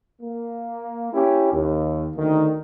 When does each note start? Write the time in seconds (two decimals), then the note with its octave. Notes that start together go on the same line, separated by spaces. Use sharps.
0.21 A#3
1.12 C#4 E4 G4
1.53 D#2
2.17 D2 D#3